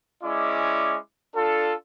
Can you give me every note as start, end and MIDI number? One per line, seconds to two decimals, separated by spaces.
0.23 0.96 56
0.23 0.96 61
0.23 0.96 64
0.23 0.96 74
0.23 0.96 86
1.35 1.73 62
1.35 1.73 65
1.35 1.73 69